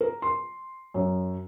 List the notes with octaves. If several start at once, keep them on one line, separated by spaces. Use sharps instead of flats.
A#4
C6
F#2